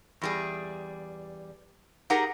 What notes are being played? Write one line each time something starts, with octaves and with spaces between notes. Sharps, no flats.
E2 G3 G#4
D#4 G4 G#4 A#4 F#5 A#5